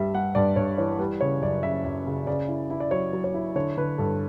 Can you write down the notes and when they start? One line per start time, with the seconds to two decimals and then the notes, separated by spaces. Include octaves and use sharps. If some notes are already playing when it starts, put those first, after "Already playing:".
Already playing: G2 G3 E5
0.14 G3 F#5
0.35 G2 D5
0.56 G2 C#5
0.78 E3 C#5
0.99 G3 B4
1.21 C#3 C#5
1.42 F#2 D5
1.63 C#3 E5
1.85 F#2
2.06 C#3
2.27 C#3 D5
2.49 E4
2.70 E4
2.80 D5
2.91 F#3 C#5
3.13 F#3
3.24 C#5
3.34 E4
3.56 D3 C#5
3.77 D3 B4
3.98 G2 A4